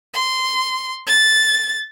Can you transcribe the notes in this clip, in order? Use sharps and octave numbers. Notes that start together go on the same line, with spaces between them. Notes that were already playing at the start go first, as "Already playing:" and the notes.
C6
A6